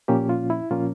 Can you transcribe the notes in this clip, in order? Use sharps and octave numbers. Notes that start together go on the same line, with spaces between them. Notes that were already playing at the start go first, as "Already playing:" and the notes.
A#2 F3 A#3 C#4 G4
F4
E4
A#2 F3 A#3 C#4 F4